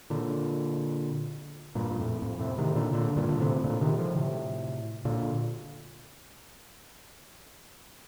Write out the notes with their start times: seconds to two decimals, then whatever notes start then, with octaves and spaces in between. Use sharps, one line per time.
0.10 A#2 D3
1.75 G2 A#2
1.90 A#2
1.99 F2 A2
2.22 F2 A2
2.39 A2 C3
2.58 C3 D#3
2.75 A#2 D3
2.93 A#2 D3
3.17 G2 A#2
3.29 D3
3.40 A2 C3
3.64 A#2 D3
3.81 C3 D#3
3.98 D3 F3
4.16 A2 C3
5.05 A#2 D3